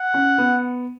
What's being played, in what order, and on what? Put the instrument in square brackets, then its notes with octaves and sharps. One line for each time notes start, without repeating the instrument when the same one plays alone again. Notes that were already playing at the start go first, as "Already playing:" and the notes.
Already playing: [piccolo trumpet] F#5
[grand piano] C#4
B3